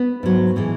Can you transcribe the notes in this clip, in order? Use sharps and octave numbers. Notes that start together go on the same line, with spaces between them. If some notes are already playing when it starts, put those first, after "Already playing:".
Already playing: B3
G#2 F#3
A2 E3 G#3